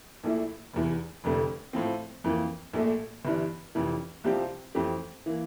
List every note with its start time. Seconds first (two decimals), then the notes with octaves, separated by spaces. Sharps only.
0.24 A#1 A#2 A3 E4
0.73 F1 E2 E3
1.24 F1 F2 D3 A3
1.73 A2 F3 C4
2.24 F2 E3 A#3
2.73 A#1 A#2 A3
3.25 G1 G2 E3
3.75 F1 F2 E3
4.24 C2 C3 F3 C4 G4
4.75 F2 E3 A3 C4 G4
5.26 E3 A#3